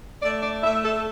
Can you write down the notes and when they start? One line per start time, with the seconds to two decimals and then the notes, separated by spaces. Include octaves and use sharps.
0.23 A3 D5
0.43 D5
0.64 A3 E5
0.84 A4